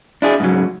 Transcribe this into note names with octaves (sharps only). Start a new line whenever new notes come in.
D4 E4 G#4
G#2 C#3 F#3